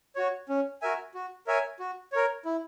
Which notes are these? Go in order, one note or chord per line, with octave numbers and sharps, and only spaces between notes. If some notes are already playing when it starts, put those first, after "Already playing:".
F#4 C#5
C#4
F#4 A#4 E5 G#5
F#4
A#4 C#5 E5 G#5
F#4
A#4 C#5
E4